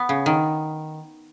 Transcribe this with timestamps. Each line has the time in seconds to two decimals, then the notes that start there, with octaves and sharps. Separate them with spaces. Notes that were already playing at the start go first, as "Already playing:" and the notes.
Already playing: B3
0.09 C#3
0.26 D#3